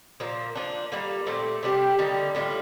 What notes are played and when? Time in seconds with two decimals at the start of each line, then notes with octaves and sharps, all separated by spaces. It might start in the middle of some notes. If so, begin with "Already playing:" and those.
0.20 A#2 F3 A#3
0.55 F3 A#3 D4
0.92 G3 A#3 F4 A4
1.26 A#2 A3 C4 G4
1.63 C3 G3 D4 G4
1.98 D3 G3 A#3 D#4
2.35 A2 G3 D4 F4